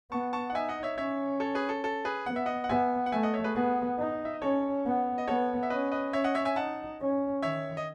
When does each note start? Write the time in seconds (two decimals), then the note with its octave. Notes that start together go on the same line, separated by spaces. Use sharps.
0.11 B3 A5 C#6
0.33 A5 C#6
0.50 F#5
0.54 D#4 E5 G#5
0.69 D#5 F#5
0.83 C#5 E5
0.98 C#4 C#5 E5
1.40 A4 C#5
1.55 G#4 B4
1.69 A4
1.84 A4
2.05 G#4 B4
2.26 B3 F#5
2.36 E5
2.46 D#5 F#5
2.64 F#5
2.69 B3 E5 G#5
3.06 F#5
3.12 A3 E5 G#5
3.23 D#5 F#5
3.34 C#5 E5
3.44 G#4 B4
3.55 B3 G#4 B4
3.98 D#4
4.25 E5
4.34 D#5
4.42 C#4 A4 C#5
4.85 B3
5.18 D#5
5.28 B3 A4 C#5
5.63 E5
5.70 C#4 B4 D#5
5.91 B4 D#5
6.13 C#4 C#5 E5
6.24 D#5 F#5
6.35 C#5 E5
6.45 E5 G#5
6.56 D#4 F#5 A5
7.00 C#4
7.43 D#3 C#5 E5
7.77 D#5